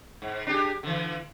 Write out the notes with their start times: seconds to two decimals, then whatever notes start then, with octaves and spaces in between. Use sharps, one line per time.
0.22 G#2
0.47 D4 G4 G#4
0.83 D3 E3